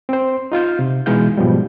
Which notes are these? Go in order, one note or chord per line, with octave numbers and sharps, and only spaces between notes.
C4 C5
D#4 F4 F5 G6
C3
B2 E3 G#3 D#4 F5 G6
G#2 B2 F3 G3